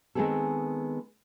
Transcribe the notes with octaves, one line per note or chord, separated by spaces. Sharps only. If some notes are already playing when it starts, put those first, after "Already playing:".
D#3 G#3 B3 C4 G#4 A4